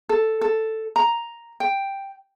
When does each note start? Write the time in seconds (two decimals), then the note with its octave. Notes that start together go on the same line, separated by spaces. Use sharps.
0.09 A4
0.41 A4
0.96 A#5
1.60 G5